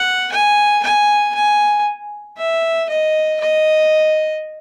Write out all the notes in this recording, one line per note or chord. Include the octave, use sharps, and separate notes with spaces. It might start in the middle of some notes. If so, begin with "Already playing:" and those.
Already playing: F#5
G#5
G#5
G#5
E5
D#5
D#5